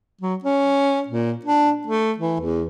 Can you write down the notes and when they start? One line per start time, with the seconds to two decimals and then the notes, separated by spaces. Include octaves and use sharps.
0.21 F#3
0.44 C#4
1.08 A#2
1.45 D4
1.87 A3
2.18 E3
2.40 E2